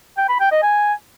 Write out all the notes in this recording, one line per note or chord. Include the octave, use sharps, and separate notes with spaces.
G5
B5
G5
D#5
G#5